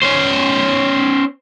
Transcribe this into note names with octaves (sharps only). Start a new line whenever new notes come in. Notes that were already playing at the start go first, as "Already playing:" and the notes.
C#4 C5